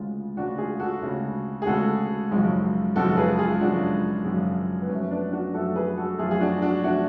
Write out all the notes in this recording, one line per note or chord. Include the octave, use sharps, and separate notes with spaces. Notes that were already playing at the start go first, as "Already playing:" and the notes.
Already playing: D2 C#3 G#3 F4
D2 C#3 G#3 D4 F#4
F4 G#4
F#4 A4
D2 C#3 G#3
G#4
D2 C#3 G#3 F#4 A4
G#1 F#2 C#3 F3 G#3
G#1 F#2 C#3 F3 G#3 F#4 A4
G#4 B4
F4 G#4
G#1 F#2 C#3 F3 G#3 D4 F#4
G#1 F#2 C#3 F3 G#3
B3
F#2 F3 A3 C#4
B3 D4
D4 F#4
F#2 F3 A3 F#4 A4
G#4 B4
F#4 A4
F#2 F3 A3 F4 G#4
G#4
D4 F#4
D4 F#4
F3 A3 D4 F#4